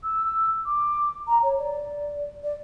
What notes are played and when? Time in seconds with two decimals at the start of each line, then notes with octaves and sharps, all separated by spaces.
0.03 E6
0.66 D6
1.27 A#5
1.43 C#5
1.58 D5
2.43 D5